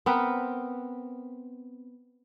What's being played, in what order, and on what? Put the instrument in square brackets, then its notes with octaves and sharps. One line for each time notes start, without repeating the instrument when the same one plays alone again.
[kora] B3 C4 A#4 B4